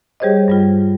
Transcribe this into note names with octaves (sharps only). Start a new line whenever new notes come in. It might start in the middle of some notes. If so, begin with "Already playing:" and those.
G3 G4 G#4 C5 C#5 D#5
G2 G3 F4